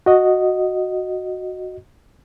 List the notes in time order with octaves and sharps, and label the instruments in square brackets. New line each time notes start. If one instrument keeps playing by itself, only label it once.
[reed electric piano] F#4 D#5